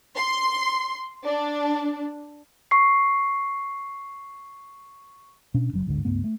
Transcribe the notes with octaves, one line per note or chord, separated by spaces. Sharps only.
C6
D4
C#6 C7
B2 C#4 D4
F#1 F#3
G1 D2 G#2 D3
C#2 G2 A3 B3
A3